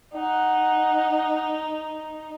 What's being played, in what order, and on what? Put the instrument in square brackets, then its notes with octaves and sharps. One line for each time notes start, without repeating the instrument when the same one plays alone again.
[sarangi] D#4 [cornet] F#5